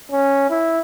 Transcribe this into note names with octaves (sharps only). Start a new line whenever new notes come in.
C#4
E4